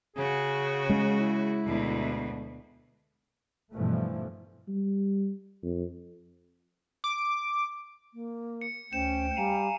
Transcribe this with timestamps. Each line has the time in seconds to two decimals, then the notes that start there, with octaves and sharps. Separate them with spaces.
0.16 C#3 F#4 G#4
0.90 G#3 C#4
1.18 E4
1.66 D2 B2
3.74 G2 B2 E3 F3 A3
4.68 G3
5.63 F2
7.04 D6
8.14 A#3
8.61 C#7
8.93 D2 C#4 C5 G5 E7
9.36 G3 F5 G#5 A#5